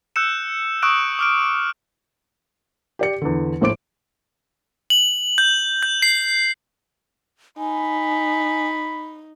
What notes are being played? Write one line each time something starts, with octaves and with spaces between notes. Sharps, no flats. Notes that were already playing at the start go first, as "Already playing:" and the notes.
E6 F#6 G6 C#7 E7
C#6 D#6 E6 F#6 D7 E7
D6 F6 D7
G4 D5 C#7
E2 D3
A#1 A2 C5 D6 D7
F#7
G6
G6
C7
D#4 G#5 B5